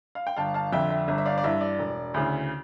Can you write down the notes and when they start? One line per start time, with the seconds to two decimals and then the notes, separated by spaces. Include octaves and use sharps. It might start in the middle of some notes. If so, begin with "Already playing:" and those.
0.15 F5
0.27 G5
0.37 G1 F5 A5
0.54 F5 A5
0.73 F2 D3 E5 G5
0.90 E5
1.08 G1 E5
1.18 E5
1.26 D5 F5
1.38 D5
1.44 G2 E3 E5
1.61 D5
1.79 E1
2.14 D2 C#3 E3